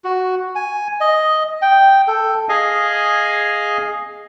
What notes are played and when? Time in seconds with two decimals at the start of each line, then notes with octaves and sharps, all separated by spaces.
0.04 F#4
0.55 G#5
1.01 D#5
1.62 G5
2.08 A4
2.49 G#4 D#5 F5 G#5